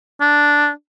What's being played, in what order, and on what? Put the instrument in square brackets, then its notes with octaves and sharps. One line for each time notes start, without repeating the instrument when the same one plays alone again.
[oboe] D4